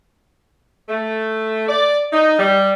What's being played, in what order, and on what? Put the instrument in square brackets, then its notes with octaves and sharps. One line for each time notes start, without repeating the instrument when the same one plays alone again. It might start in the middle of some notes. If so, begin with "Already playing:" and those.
[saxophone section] A3
D5
D#4
G3